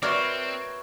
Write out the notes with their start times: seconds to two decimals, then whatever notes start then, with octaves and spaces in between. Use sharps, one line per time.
0.03 C4 F#4 A#4 B4 C#5 D5 E5